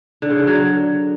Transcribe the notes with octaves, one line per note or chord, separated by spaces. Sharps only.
D3
C#3
D3
F#3